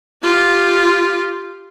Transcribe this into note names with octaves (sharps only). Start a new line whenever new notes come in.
F4 G4